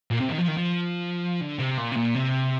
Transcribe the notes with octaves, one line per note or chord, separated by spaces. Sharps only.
A#2
C3
D#3
F3
D#3
F3
D3
C3
A#2
C3
A#2
C3